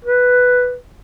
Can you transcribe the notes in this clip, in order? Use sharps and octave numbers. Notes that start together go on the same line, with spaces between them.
B4